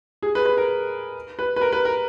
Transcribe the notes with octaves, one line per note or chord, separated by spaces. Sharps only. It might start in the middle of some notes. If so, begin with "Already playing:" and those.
G#4
B4
B4
A#4
B4
B4
A#4
B4
A#4